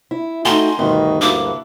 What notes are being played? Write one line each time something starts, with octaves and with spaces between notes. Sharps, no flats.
E4
A3 D#4 F#4 G5 G#5 A#5 C6
D2 G2 B2 D#3 B4
A#3 D4 E4 F#4 D6